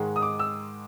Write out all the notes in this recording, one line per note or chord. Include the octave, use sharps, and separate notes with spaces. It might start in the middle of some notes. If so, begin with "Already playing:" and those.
Already playing: G#2 D#3 G#3
D#6
D6
E6